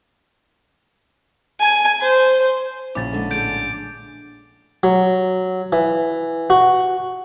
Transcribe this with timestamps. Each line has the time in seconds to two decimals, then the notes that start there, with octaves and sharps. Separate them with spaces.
1.60 G#5
2.01 C5
2.95 A#1 C#3 F3 C#4 E4 D6 A6
3.13 D3 G#3 D#5
3.31 E2 A2 G#4 G6 A6 D7
4.83 F#3
5.72 E3
6.50 F#4